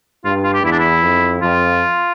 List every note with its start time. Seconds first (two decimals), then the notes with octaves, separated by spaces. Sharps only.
0.25 G2 F4
0.44 F4
0.54 G4
0.64 E2 E4
0.72 D4
0.79 E4
1.03 F2
1.42 F2 F4